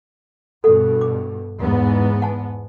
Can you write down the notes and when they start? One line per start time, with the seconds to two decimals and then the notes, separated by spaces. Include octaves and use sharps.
0.64 G2 B2 A4 F#5
1.01 D6
1.58 E2 G#2 B3
2.22 F#5 G#5 A5